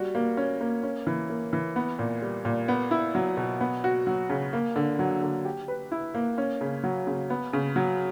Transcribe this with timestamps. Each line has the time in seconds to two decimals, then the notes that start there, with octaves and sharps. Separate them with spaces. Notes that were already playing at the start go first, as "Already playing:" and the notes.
Already playing: G3 F#4
0.15 A#3
0.37 C#4
0.61 A#3
0.83 C#4
1.07 E3
1.30 A#3
1.53 E3
1.76 B3
1.99 A#2
2.22 G3
2.45 A#2
2.68 B3
2.91 E4
3.15 F#3
3.37 B2
3.61 B3
3.84 F#4
4.07 F#3
4.30 C#3
4.53 A#3
4.76 D3
4.99 F#3
5.22 D3
5.45 G4
5.68 B4
5.92 E4
6.15 A#3
6.38 C#4
6.61 C#3
6.84 F#3
7.07 C#3
7.30 B3
7.53 C#3
7.76 F#3